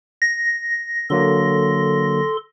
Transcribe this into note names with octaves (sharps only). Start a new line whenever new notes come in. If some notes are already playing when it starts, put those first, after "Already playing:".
A#6
D3 F#3 A#3 A4 C6